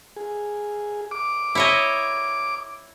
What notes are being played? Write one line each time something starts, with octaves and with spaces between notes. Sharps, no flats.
G#4
D6
E4 C#5 D#5